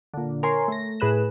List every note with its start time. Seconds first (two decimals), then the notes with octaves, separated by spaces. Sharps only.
0.14 A#2 D3
0.43 A#4 C#5 G#5 C6
0.68 A3 A#6
1.00 A2 G#4 B4 F#6 E7